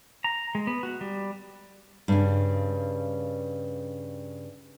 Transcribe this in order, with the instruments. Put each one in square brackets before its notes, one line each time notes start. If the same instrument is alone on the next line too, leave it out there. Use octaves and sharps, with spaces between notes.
[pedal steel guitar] A#5
G#3
B3
F#4
G3
[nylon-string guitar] G2 C#3